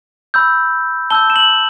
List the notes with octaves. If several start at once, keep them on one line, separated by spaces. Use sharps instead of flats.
B5 E6 G6
A5 E6 G6 G7
E7
F#7